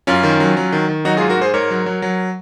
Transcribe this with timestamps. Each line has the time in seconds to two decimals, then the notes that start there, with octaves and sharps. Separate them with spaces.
0.07 F#2 C#4 F4
0.23 D#3
0.40 F#3
0.57 F#3
0.72 D#3
0.89 D#3
1.05 F#3 D#4 F#4
1.17 G#2 F4 G#4
1.29 F#4 A#4
1.37 G#2 G#4 C5
1.54 G#2 A#4 C#5
1.70 F#3
1.86 F#3
2.02 F#3